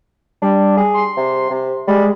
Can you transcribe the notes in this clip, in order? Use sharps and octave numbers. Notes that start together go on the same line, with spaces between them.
G3 D4
G#4
C6
C3
C3
G3 G#3